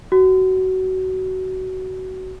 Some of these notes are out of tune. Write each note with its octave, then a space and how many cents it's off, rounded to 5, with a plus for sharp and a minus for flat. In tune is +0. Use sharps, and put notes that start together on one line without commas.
F#4 +20